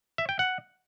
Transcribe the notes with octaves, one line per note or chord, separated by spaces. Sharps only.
E5
G5
F#5